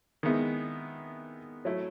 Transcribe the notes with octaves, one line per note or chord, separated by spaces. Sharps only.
D#3 G#3 B3 E4
F#3 A3 E4